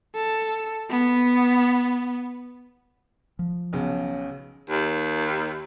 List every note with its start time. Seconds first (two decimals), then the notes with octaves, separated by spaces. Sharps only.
0.15 A4
0.90 B3
3.39 F3
3.73 B1 C#3
4.70 D#2